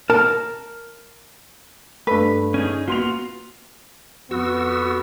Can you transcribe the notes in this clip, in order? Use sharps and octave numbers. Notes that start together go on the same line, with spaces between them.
A#4 A5
G2 A3 B4
C#4 D#4 G#4
A#3 B3 F4 F#4 C6 F7
F2 B3 F#4 E6